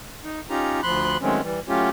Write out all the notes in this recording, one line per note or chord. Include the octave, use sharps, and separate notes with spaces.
D#4
C#4 D#4 F4 G4 A#5
D2 F3 B5 C6 F#6
D#3 F#3 G#3 A3 C4 C#4
E3 G3
F#3 A3 C#4 F4 G4